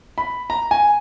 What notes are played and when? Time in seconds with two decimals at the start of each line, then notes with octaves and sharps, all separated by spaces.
0.18 B5
0.50 A#5
0.71 G#5